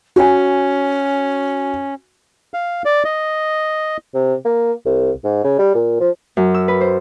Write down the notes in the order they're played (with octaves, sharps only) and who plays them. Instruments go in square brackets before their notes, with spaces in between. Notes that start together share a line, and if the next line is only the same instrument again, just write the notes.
[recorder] C#4 [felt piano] F#4 G#5
[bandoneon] F5
D5
D#5
[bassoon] C3
A#3
C2
G#2
C#3
G3
A#2
F3
[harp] F#2
E6
B4
C5